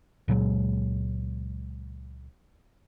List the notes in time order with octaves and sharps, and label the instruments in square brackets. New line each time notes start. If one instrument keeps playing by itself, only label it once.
[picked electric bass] C#2 A#2 F#3 G#3